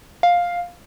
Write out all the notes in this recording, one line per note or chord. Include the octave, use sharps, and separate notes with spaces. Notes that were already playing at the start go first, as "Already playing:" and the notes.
F5